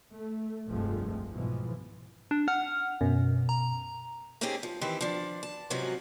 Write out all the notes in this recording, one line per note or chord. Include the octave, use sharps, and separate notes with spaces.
A3
F1 C2 G2 F3 G#3 A3
G#2 B2 E3 F3
D4
F#5 F6
F#2 B2
A#5
A#3 C4 C#4 D#4 G4 G#4
F3
D#3 E3 C4 G4 C5
F3 D4
A5
G#2 C3 F3 F#3 C#4 F#4